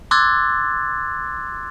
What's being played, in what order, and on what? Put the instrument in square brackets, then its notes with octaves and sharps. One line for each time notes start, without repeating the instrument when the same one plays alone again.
[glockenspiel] C6 D6 E6 F#6 G#6 A6